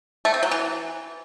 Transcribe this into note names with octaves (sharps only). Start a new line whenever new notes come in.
A3
C4
F#3
E3